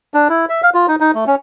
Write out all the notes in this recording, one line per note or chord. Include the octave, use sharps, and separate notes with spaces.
D4
E4
E5
F5
F4
D#4
D#4
A3
C#4